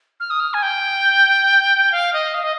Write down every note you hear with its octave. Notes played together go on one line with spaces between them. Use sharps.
F6
D#6
F6
G#5
G5
F5
D#5
F5
D#5